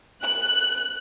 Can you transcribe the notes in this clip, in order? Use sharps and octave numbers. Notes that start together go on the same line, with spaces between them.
F#6